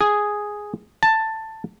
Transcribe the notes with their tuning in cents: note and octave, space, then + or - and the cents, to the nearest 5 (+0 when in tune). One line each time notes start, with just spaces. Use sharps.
G#4 +0
A5 +10